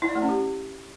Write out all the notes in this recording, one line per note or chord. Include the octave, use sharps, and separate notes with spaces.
E4
D5
A3
C#4
G4